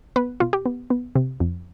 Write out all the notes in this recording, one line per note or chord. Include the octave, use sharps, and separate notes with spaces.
B3 B4
B2 F4
G4
B3
B3
C3
F2